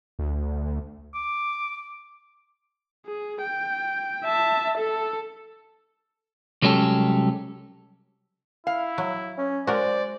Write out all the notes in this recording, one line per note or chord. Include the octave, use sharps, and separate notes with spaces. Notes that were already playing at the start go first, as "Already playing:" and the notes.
D2
D6
G#4
G5
E5 A5
A4
C2 F#3 G#3 C#4 G4 A4
E4 F5
F#3
C#4
G#3 F#4 A#4 C5 D5